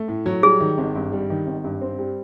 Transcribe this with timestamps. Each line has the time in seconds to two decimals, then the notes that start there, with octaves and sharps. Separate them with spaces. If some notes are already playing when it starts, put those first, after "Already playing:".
Already playing: A3
0.08 A2
0.26 F#3
0.43 G3 G#4
0.60 D#3
0.78 G#1
0.95 G2
1.12 G3
1.30 D#3
1.47 G#1
1.64 G2
1.82 C4
1.99 G3